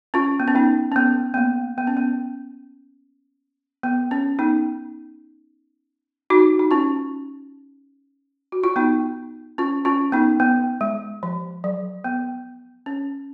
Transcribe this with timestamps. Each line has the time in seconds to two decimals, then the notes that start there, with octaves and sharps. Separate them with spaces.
0.14 C#4 F4
0.40 B3
0.48 C#4
0.55 B3 D#4
0.92 C#4
0.96 B3
1.34 B3
1.37 A#3
1.78 B3
1.87 C#4
1.97 B3
3.83 B3
4.11 C#4
4.39 B3 D#4
6.30 D#4 F#4
6.59 D#4
6.71 C#4 F4
8.52 F#4
8.64 F4
8.76 B3 D#4
9.58 C#4 F4
9.85 C#4 F4
10.12 B3 D#4
10.40 B3
10.81 G#3
11.23 F3
11.64 F#3
12.04 B3
12.86 C#4